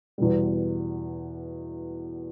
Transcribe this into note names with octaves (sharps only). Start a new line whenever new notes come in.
E2 B2 G3